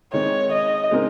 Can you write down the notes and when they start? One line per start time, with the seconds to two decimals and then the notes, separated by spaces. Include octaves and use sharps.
0.12 D#3 G#3 C4 C#5
0.52 D#5
0.91 C#3 G#3 C4 D#4 A#4